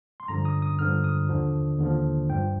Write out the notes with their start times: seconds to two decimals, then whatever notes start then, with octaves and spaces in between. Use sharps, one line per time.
0.20 C6
0.28 G2 D3 F3 A#5
0.45 D#6
0.62 D#6
0.79 G2 D3 F3 F6
1.04 D#6
1.29 D#2 D3 F3
1.79 D#2 D3 F3
2.29 G2 F3 G5